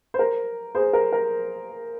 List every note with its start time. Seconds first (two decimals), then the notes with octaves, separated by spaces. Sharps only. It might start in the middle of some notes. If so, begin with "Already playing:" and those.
0.14 C5
0.19 A#4
0.75 G#4 C5
0.93 A#4
1.13 A#4